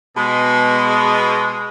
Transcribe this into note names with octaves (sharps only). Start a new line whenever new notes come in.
B2 G#3